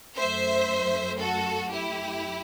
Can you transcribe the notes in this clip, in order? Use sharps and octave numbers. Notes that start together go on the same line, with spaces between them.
F#2 F#3 A3 C5 E5
F#4 A4
E4 G4